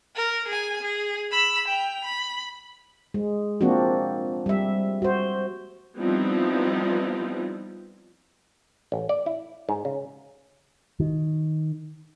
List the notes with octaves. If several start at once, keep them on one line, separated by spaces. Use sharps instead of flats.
A#4
G#4 G#5
G#4
B5 E6
G5 F7
B5
G#3
F3 A#3 C4 D4 F#4
G3 E5
F#4 C5
F3 G3 B3 C4 D#4 E4
A1
D5
E4
G#2
C#3
D#3